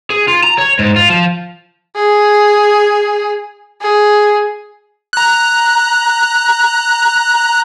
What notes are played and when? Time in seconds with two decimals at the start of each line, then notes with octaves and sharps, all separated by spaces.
0.10 G#4
0.28 F4
0.43 A#5
0.58 C#5
0.79 G#2
0.96 F4
1.10 F3
1.96 G#4
3.82 G#4
5.13 A#5 F#6